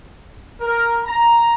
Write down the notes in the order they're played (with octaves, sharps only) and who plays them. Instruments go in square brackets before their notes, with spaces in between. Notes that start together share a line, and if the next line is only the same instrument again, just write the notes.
[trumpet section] A#4
A#5